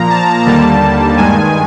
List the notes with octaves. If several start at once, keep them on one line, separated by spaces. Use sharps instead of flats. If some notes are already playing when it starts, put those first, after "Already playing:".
Already playing: A#2 F3 A#3 A#5
A5
D#2 D3 G3 A#3 A5
G2 D#3 G#3 G#5